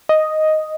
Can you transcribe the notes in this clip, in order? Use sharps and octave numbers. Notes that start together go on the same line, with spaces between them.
D#5